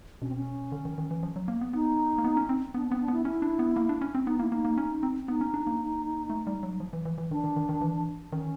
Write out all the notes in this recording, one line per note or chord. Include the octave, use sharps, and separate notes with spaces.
B2 C#4
C4
C#4
D3
D#3
D#3
E3
F3
F#3
A#3
B3
B3 D#4
A#3
B3
C#4
C4
B3 D4
B3 C4
D4
B3 E4
C#4 E4
D4
B3
A#3
D4
C#4
C4
B3 D#4
A#3 E4
A#3 D#4
A#3
C#4
C4
B3 D#4
C#4
D4
A#3
A3
G3
F#3
F3
E3
E3
E3
D#3 D4
D#3
D#3
D#3
E3
D#3 C#4